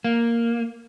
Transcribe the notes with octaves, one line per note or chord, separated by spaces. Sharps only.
A#3